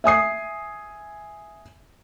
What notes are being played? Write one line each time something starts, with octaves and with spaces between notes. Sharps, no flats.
E5 G#5 D#6 C7